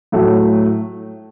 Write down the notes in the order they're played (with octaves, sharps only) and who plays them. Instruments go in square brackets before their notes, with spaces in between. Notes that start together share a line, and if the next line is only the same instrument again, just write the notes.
[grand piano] A2 F#3 A3